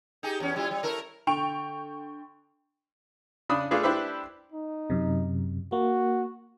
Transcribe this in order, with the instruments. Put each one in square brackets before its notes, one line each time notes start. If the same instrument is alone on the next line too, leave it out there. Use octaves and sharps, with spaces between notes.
[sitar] D#4 G4 G#4
E2 C#4
G3 E4 F4
G3
A3 E4 A#4
[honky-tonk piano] D3 G5 C#6 D7 F7
[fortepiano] C#3 D4 B5 D#6
A3 D4 F4 G#4 B4
D4 E4 G4 B4 C5 E5
[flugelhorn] D#4
[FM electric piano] F#2 C3
[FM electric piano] A#3 [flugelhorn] F#4